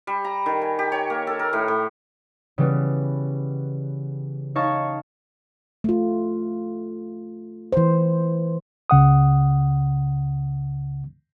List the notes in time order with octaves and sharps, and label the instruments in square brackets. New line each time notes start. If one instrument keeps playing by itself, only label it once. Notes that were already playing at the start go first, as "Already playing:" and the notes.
[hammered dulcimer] G3
A#5
D#3
G#5
G4
C#5
A#3
A4
A#4
A2
A2
[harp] C#3 E3 G3 B3
D#4 C#5 F5 A5 C#6
[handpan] A3 F4
E3 C5
[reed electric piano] C#2 C#3 F#5 D#6